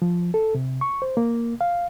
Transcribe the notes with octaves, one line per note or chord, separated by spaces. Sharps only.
F3
A4
C3
C#6
C5
A#3
F5